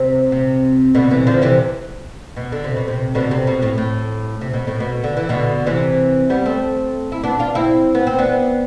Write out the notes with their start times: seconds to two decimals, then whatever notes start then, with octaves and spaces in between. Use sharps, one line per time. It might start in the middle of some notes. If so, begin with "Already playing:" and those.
Already playing: C3
0.32 C3
0.95 B2 D3
1.11 C3 E3
1.27 D3 F3
1.42 C3 E3
2.36 B2
2.52 D3
2.64 C3
2.76 B2
2.88 C3
3.15 B2 D3
3.31 C3
3.47 B2
3.62 A2
3.78 A2
4.41 C3
4.54 B2
4.67 A2
4.80 B2
5.04 D3
5.17 E3
5.29 B2 D3
5.67 C3 E3
6.30 G3 B3
6.45 A3 C4
7.12 E4
7.23 B3 D4
7.39 D4 F4
7.55 C4 E4
7.95 B3
8.07 C4
8.19 B3 D4